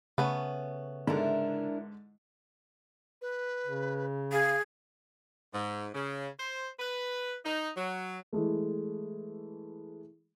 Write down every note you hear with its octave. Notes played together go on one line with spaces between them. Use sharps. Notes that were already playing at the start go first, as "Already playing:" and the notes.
C#3 A3 B3 C#4
G#2 D3 D4 E4 A#4
B4
C#3
G#4 F5
G#2
C#3
C5
B4
D#4
F#3
E3 G#3 A3